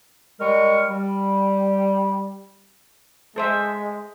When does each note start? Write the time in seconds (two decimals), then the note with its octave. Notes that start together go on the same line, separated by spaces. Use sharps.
0.40 G3 G#3 A#4 C#6
0.89 G3
3.36 G#3 A4 C5 E5